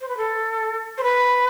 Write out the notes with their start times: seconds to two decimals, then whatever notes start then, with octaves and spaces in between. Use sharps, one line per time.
0.01 C5
0.08 B4
0.17 A4
0.97 C5
1.03 B4